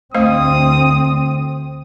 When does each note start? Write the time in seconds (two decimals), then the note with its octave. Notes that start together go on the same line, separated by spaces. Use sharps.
0.15 D2 A3 C4 C5 F5 D#6